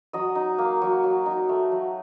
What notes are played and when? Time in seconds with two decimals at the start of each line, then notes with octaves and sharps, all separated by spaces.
0.13 F#3 D#5
0.35 D#4
0.58 A#3
0.82 F#3
1.04 F#3
1.26 D#4
1.49 A3
1.72 F#3